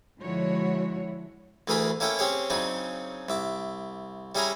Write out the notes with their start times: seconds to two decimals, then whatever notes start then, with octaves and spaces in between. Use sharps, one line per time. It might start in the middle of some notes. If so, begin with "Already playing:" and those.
0.21 D3 F3 G#3 E4 F#4 C#5
1.68 D2 E3 A3 G#4 A#4 B5
2.00 A#3 C#4 E4 A4 G5
2.19 C4 C#4 G4 G#4 C#5
2.50 C#3 F#3 C4 D4 D#4
3.29 C2 E5 D6
4.35 G3 C#4 E4 G#4 G#5 A#5